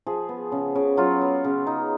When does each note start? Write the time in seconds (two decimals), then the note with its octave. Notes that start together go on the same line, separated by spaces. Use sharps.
0.07 F3 G#4
0.29 B3
0.52 C#3
0.75 C#3
0.97 F#3 F4
1.21 B3
1.44 C#3
1.67 D#4